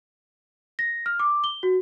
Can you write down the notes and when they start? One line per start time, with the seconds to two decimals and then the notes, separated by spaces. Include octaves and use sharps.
0.79 A#6
1.06 F6
1.20 D6
1.44 G7
1.63 F#4